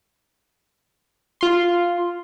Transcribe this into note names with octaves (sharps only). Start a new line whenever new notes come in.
F4 C6